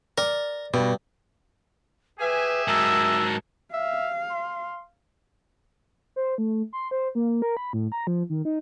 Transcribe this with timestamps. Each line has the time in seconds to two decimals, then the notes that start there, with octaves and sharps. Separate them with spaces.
0.18 A#4 D5
0.74 G2 B2
2.20 G4 G#4 B4 E5 G#5
2.68 G#2 F#3 A#4 A5 E6
3.73 E5 F5
4.30 C6
6.16 C5
6.38 A3
6.73 C6
6.91 C5
7.15 A#3
7.42 A#4
7.57 B5
7.73 A2
7.92 A#5
8.07 F3
8.30 D#3
8.45 D#4